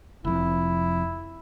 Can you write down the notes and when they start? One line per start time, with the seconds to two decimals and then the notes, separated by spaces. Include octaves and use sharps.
0.25 F1 F2 E4